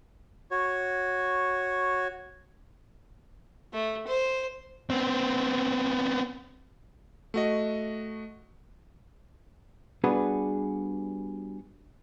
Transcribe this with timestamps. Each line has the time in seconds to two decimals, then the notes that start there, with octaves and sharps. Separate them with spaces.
0.51 F#4 C#5
3.74 A3
4.08 C5
4.90 B3 C4
7.34 A3 F#4 D#5
10.04 G3 B3 D4 F#4 G#4 B4